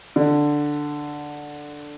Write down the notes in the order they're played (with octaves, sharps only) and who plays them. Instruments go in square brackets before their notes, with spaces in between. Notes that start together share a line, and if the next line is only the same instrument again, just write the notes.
[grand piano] D3